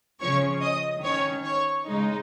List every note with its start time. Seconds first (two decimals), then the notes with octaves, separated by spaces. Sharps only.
0.20 C#3 F3 C#4 C#5 C#6
0.61 D#5 D#6
1.03 D#3 C#4 C#5 C#6
1.43 C#5 C#6
1.85 C#3 G#3 D#4